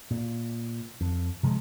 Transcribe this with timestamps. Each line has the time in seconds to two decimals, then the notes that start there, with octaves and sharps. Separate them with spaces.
0.11 A#2
1.01 F2
1.43 C3 F3 F#3 G#3